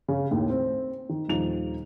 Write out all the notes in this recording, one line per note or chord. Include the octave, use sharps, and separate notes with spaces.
C#3
D#2 A2
C4
D#3
D#1 F3 D#4 F7